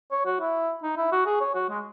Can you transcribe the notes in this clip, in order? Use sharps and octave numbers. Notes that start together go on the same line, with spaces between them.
C#5
F#4
E4
D#4
E4
F#4
G#4
C#5
F#4
G#3